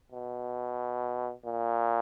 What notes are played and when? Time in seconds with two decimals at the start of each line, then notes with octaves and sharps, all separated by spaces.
0.12 B2
1.45 A#2